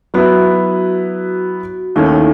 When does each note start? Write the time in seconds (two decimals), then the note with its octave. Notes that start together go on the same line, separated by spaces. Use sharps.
0.14 F#3 B3 E4 F#4 B4
1.96 D#2 D#3 A3 C#4 E4
2.06 D#4
2.16 E4